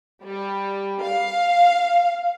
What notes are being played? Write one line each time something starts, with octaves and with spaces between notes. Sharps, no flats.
G3
F5